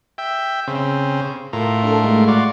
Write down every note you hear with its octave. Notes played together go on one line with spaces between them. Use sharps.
E5 G5
C#3 C4
A2 F4 A#4
D4 A4
G#3 A3
F4 F#4 D5